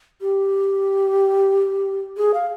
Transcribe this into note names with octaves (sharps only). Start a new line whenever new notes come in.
G4
G#4
F5